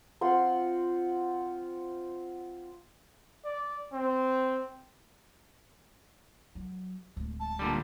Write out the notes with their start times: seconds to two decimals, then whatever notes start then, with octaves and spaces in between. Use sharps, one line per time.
0.21 C4 F4 F#5 C6
3.45 D5
3.93 C4
6.55 F#3
7.16 D1 G#3
7.40 A5
7.59 A#2 D3 G3